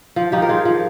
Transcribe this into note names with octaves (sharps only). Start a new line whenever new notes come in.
F3
F3 D#4 G4
A#4
F3 F4 G#4
F3